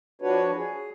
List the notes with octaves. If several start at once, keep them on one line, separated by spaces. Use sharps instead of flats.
F3 D4 F#4 B4 C#5
G#4